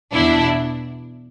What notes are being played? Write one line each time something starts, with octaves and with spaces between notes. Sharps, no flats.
E2 B2 D4 E4